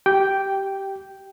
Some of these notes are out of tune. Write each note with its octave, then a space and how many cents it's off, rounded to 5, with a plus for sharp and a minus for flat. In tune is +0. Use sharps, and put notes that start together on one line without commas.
G4 -15 G5 +0